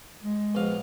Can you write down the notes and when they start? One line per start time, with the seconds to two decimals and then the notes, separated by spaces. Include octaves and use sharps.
0.22 G#3
0.55 A#1 B2 F5